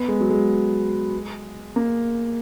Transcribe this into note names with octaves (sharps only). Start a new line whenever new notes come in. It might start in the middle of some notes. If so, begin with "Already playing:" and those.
Already playing: B3
G#3
F#3
G#3
A#3